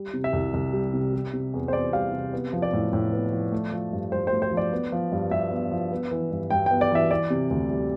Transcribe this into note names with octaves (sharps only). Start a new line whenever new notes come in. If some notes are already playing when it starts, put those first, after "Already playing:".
Already playing: G3
C3
E5
C2
C2
G3
C3
G3
C3
E2
C5
E2 D5
G3 F5
C3
B3
F3
D5
A2
A2
B3
F3
A3
F3
G2
G2 C5
A3 C5
C5
F3
D5
B3
F3
G2
G2 E5
B3
F3
B3
E3
G2
G2 G5
B3 G5
D5
E3 E5
E3 D5
C3
D2
G3